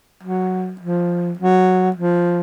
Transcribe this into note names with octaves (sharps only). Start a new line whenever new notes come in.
F#3
F3
F#3
F3